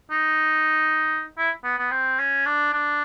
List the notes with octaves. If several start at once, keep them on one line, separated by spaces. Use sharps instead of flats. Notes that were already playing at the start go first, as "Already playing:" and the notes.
D#4
E4
B3
B3
C4
C#4
D4
D4